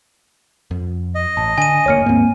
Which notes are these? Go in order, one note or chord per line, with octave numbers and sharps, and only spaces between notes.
F2
D#5
A1 A5
D3 G#5 D#7
D#1 D2 A#3 C#5 F6 C#7
D#2 G#2 A#3 C4